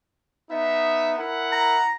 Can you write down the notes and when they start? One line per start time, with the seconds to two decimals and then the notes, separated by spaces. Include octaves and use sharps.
0.51 B3 D#4 E5
1.18 E4 A#4 F#5
1.52 A#5